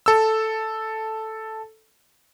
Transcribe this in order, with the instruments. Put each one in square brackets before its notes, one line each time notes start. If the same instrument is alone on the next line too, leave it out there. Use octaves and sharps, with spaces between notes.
[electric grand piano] A4 E6